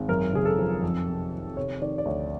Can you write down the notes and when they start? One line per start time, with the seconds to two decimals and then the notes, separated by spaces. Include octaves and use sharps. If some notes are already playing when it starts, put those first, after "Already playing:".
Already playing: G#1
0.09 F#2 A#4
0.33 C#3 G#4
0.45 A4
0.58 F3
0.82 F2
1.07 C3
1.32 D#3
1.57 C3 C#5
1.81 D#3 D5
1.98 D5
2.05 D2 C#5